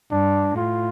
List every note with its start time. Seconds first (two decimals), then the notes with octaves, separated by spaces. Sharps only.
0.11 G2 D4
0.56 A2 F4